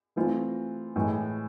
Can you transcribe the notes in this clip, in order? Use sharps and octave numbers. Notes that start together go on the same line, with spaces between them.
E3 A3 C4 F4
A2 E3 G#3